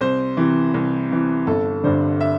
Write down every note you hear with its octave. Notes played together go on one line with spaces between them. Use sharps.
C2 C5
C3 E3
C2
C3 E3
G1 A4
G2 D3 C5
E5